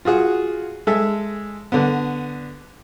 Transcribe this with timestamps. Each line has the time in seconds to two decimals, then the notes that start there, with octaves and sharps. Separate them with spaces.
0.05 F4 F#4 G#4 F#5
0.87 G#3 A4 E5
1.72 D3 B3